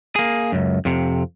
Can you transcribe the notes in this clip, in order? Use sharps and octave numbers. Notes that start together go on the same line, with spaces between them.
A#3 G#4
C#2 F#2
F2 C3